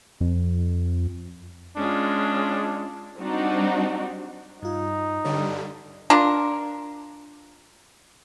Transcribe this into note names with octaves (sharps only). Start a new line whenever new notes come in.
F2
G#3 C#4 D4 F4
G3 C4 D4 D#4 F#4
G2 D#4 F4
G2 D3 G3 C#5 D5
D4 F4 A#4